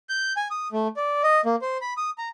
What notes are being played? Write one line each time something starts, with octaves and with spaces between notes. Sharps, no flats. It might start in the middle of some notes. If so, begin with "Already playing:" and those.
G6
G#5
D#6
A3
D5
D#5
A#3
C5
B5
D#6
A#5